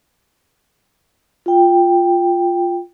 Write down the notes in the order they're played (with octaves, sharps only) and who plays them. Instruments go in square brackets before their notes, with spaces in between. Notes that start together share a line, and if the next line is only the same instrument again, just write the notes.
[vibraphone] F4 G5